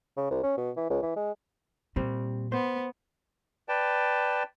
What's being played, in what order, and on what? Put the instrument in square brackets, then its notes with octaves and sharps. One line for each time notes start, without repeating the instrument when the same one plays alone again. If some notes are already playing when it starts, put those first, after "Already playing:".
[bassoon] C#3
C2
C#4
B2
E3
C#2
E3
G#3
[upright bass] A#2 [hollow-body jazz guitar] G3 C4
[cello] B3 [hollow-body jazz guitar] C5
[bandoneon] B4 D5 G5 A5